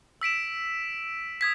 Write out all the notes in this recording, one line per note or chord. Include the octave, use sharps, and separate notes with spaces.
E6 B6 D7 E7
D#6 G#6 B6